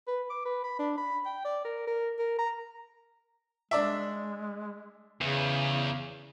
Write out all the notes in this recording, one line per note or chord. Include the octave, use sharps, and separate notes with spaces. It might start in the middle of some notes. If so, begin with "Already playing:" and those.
B4
D6
B4
B5
D4
B5
G5
D5
A#4
A#4
A#4
A#5
G#3 D4 D5 E5
E2 C#3